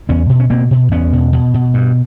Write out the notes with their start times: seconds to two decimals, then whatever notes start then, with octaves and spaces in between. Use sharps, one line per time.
0.09 E2 B3 C#4
0.29 B2
0.40 C#4
0.50 B2 A#3 C4
0.71 B2
0.92 E2 B3 C#4
1.13 B2
1.33 B2
1.54 B2
1.74 G2